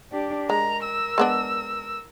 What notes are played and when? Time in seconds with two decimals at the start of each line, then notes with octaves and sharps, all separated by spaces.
0.12 D4 G4
0.50 G#3 A#4 A#5
0.83 E6
1.18 G#3 B3 D4